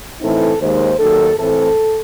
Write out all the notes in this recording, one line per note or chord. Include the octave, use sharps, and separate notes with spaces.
A2 E3 C4 D#4 A4
D#2 D#3 G#3 C5
D#2 D#3 F#3 A4
A2 E3 A3 C4 A4